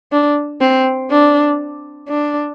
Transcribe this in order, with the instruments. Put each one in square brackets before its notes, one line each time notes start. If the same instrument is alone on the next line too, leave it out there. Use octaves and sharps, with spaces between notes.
[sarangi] D4
C4
D4
D4